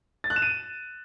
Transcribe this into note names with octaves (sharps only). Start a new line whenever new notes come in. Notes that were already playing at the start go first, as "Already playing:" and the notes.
A6
F#6
E7
D#7